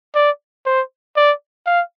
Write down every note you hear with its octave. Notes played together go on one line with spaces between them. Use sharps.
D5
C5
D5
F5